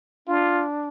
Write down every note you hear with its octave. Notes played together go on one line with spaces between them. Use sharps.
D4 F4